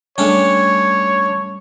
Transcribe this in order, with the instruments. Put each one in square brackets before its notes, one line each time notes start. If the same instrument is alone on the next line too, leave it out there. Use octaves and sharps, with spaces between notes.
[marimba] G3 [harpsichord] A3 C#4 D4 [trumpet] C#5